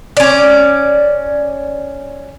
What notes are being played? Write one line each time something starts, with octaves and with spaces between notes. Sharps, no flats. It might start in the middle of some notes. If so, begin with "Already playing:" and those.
C#4 D5